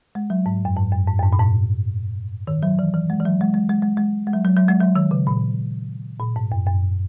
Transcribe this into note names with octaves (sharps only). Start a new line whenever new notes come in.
G#3
F#3
G#2
F#2
G#2
F#2
G#2
F#2
G#2
A#2
G#2
D#3
F#3
E3
E3
G#3
E3
F#3
G#3
G#3
G#3
G#3
G#3
G#3
F#3
F#3
F#3
G#3
F#3
D#3
C#3
A#2
A#2
G#2
F#2
F#2